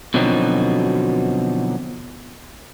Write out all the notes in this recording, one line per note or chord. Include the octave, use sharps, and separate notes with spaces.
B2 D3 F3 F#3 C4 D#4